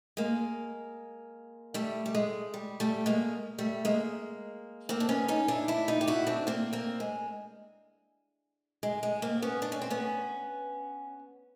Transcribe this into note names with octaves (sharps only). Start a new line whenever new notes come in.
G#3 A#3
G3 A3
G3
G#3
G3
G3 A3
G#3 A#3
G3 A3
G#3 A#3
A#3 C4
D4
B3 C#4
C#4 D#4
D4 E4
D4 E4
D#4 F4
G4
E4 F#4
C4 D4
A#3 C4
A#3 C4
G#3
G#3
G#3
A#3 C4
B3 C#4
D4
C#4
C4
B3 C#4